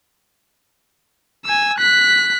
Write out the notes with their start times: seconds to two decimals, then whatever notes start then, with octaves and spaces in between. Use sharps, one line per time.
1.46 G#5 E6
1.78 F#6 B6